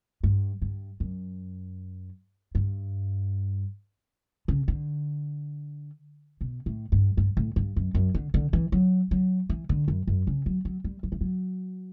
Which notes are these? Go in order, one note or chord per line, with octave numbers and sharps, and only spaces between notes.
G2
G2
F#2
G2
C#3
D3
B2
A2
G2
G2
A2
G2
F#2
F#2
D3
D3
E3
F#3
F#3
E3
D3
F#2
F#2
C#3
F#3
F#3
G3
F#3
E3
F#3